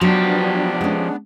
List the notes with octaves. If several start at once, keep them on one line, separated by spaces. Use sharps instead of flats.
F3 F#3 B3 D4 G4
G#3 C#4